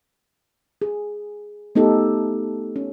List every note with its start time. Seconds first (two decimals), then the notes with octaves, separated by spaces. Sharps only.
0.82 G#4
1.75 A3 B3 D#4 G4 A4
2.76 C#4